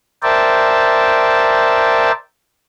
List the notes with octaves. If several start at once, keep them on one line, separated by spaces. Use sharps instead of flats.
A#4 C5 D5 E5 G5 A5